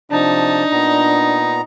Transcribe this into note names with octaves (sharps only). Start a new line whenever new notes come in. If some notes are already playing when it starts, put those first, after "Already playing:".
C3 F3 D4 D#4 A5
A#2 B3 A#5